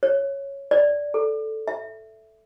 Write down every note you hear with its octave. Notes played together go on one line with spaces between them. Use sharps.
C#5
D5
A4
E5